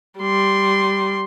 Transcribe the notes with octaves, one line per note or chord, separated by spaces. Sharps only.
G3 C6